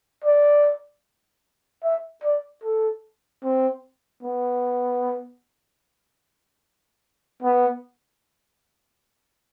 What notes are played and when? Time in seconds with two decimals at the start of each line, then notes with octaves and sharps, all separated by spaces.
0.24 D5
1.83 E5
2.24 D5
2.64 A4
3.43 C4
4.23 B3
7.43 B3